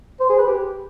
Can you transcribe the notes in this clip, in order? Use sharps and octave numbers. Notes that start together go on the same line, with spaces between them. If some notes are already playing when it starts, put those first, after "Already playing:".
C5
G#4
B4
G4